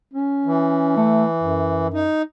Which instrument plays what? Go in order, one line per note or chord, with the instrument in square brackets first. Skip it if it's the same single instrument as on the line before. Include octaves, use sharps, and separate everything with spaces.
[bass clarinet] C#4
[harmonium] E3
[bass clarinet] A3
F#2
[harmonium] D#4